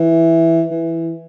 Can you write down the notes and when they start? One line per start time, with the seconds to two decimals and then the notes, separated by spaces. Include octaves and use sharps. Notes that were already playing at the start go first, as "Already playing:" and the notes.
Already playing: E3
0.71 E3